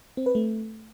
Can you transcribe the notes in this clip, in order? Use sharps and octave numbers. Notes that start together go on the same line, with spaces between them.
C4
B4
A3